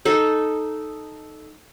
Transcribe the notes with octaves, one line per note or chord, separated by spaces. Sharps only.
D#4 A4